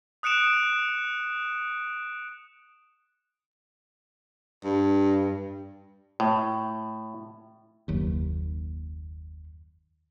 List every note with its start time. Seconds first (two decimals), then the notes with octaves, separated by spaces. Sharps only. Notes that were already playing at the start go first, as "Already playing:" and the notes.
0.23 D#6 F#6 C#7 D7 E7
4.64 G2
6.20 A2
7.88 F#1 D#2